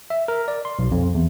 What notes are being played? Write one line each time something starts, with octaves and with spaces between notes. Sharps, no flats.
E5
A#4
D5
C6
B1
F2
E2